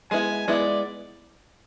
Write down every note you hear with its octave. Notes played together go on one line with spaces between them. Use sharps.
G#3 B3 E4 G#5
G#3 B3 E4 D5